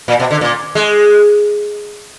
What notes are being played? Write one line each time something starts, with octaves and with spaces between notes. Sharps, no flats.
A#2
B2
D3
A#2
G#3